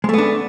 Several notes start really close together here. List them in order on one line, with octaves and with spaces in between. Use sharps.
G#3 A3 B3 D4